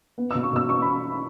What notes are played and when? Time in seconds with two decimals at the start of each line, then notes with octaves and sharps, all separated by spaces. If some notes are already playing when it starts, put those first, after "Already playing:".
0.18 B3
0.31 B2 E6
0.43 C#6
0.53 B2 E6
0.69 B3 C#6
0.82 B5